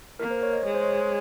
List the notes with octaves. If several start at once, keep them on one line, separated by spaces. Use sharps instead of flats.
A#3 A#4
C5
C#5
D#5
G#3 C#5
C5
C#5